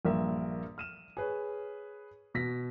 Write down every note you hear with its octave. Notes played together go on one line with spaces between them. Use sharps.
A#1 G2 A#3 A#4 E5
F6 D#7 E7
G#4 B4 C#5
B2 A#6 B6